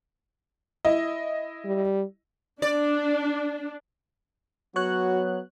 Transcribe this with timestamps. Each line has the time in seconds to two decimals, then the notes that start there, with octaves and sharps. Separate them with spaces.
0.85 E4 D#5
1.65 G3
2.62 D4 D5
4.76 F#3 B3 F#4 C#5 F#6